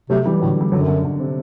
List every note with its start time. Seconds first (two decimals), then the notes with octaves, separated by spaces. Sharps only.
0.10 C3 F#3 A3
0.25 E3 G3
0.41 A2 D3 F#3
0.61 G3
0.72 F#2 D3 F#3
0.87 D3
1.04 D3
1.20 C3